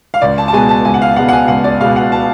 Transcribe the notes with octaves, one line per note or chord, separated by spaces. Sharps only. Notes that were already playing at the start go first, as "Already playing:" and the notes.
F5
C#2 D5
A5
A5
B2 G#3 B3 G#5
A5
C#2 G#5
F#5
F5
B2 G#3 B3 F#5
F#5
G#5
C#2 F#5
D5
B2 G#3 B3 F5
F#5
A5